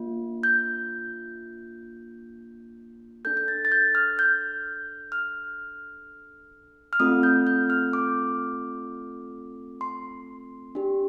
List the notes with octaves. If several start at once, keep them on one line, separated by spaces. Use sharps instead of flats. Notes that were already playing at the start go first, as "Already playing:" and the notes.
Already playing: A#3 D4 F4
G6
D4 A4 G6
G6
A6
A6
G6
F6
G6
F6
F6
A3 C4 F4 A4 D#6
G6
G6
F6
D6
C6
D4 G4